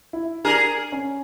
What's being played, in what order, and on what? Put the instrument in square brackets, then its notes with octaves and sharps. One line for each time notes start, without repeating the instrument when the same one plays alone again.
[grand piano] E4
[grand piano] D4 [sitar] G#4 A#4
[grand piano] C#4